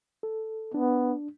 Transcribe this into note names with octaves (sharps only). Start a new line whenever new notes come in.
A4
B3 D4